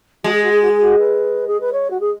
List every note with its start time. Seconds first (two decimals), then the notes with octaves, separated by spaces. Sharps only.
0.24 G#3 F#4
0.33 G#4
0.43 F#4
0.52 G#4
0.62 F#4
0.71 G#4
0.81 F#4
0.99 B4
1.47 G#4
1.61 B4
1.73 C#5
1.91 F#4
2.00 G#4